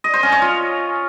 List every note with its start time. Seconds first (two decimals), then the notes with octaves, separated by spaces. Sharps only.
0.04 D#5
0.14 C5
0.23 C#4
0.32 C#5
0.42 F4